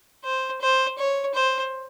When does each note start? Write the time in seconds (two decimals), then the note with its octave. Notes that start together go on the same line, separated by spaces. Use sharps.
0.25 C5
0.61 C5
0.99 C#5
1.34 C5